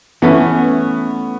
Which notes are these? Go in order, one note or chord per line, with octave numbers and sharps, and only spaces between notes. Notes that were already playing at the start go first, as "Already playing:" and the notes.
E3 A3 B3 C#4